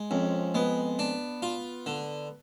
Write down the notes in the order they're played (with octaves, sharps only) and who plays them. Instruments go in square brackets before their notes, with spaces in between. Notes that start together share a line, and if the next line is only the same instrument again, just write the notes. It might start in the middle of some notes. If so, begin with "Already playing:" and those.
Already playing: [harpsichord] G#3
[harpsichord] F2 [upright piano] C#4
[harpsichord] G#3 [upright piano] B3
[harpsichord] D4
F4
D3